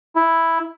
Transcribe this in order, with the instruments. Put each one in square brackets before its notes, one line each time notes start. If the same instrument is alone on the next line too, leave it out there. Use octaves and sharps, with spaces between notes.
[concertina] E4